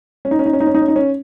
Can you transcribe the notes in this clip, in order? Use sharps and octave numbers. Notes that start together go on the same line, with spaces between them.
C#4
D#4
C#4
D#4
C#4
D#4
C#4
D#4
C#4
D#4
C#4